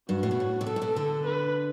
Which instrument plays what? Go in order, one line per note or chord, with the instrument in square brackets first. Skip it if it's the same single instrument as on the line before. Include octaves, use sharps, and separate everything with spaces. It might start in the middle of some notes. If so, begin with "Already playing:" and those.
[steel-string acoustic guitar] G2 [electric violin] F#4
[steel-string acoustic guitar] A2
B2
A2
C3
[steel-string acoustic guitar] B2 [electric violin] A4
[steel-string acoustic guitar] A2
B2
D3
[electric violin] B4